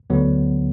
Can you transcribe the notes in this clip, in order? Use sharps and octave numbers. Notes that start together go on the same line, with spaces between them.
D2 D3 F#3 B3